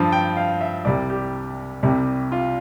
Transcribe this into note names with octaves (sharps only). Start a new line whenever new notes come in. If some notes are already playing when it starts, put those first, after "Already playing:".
Already playing: G2 F3 A5
G5
F5
E5
C2 C3 G3 D5
G4
C2 C3 G3
F4